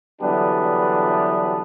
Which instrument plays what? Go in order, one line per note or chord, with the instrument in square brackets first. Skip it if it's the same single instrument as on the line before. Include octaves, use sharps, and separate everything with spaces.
[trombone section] D3 E3 F#3 G3 B3 D4